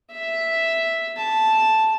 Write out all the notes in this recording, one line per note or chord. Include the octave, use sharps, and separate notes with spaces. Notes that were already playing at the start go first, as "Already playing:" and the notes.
E5
A5